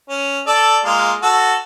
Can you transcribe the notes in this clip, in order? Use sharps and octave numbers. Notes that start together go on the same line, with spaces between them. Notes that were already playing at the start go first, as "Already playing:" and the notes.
C#4
A4 D5
G#3 A#3 F4
F#4 A4